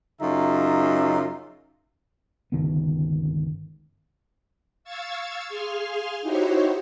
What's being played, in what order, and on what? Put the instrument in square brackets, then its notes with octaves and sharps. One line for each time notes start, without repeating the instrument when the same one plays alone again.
[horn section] F#2 C#3 D#4 F4 E5 A#5
[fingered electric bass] G1 C#2 D#3 B3
[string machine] F5 C#6 E6 G#6 A6
G#4 F5 G#5 C6 F6
D#4 E4 F#4 G4 C5 C#5